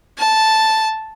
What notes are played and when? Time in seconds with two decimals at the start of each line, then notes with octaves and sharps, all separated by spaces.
0.18 A5